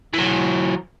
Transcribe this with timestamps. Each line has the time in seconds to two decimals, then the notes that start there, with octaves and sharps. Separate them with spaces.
0.14 E3 F#3